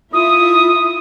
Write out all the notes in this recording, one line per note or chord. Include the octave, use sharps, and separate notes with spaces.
E4 F4 E5 D#6